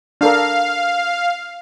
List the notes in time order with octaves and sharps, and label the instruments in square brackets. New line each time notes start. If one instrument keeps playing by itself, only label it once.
[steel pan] D4 A4 A#4 [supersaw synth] F5